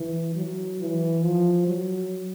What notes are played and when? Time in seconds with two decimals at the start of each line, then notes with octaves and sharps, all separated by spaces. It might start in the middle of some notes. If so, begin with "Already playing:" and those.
Already playing: E3
0.35 F#3
0.80 E3
1.23 F3
1.67 F#3